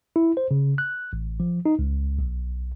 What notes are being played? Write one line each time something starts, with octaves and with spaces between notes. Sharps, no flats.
E4
C5
C#3
F#6
A1
F3
D#4
C#2
B1